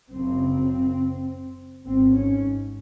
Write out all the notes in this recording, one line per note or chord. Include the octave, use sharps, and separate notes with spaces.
F#1 F#2 C#3 C4
G#1 G#2 C4
C#4